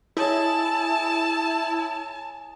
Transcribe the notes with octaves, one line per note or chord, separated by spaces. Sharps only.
E4 G#4 C#5 D#5 A5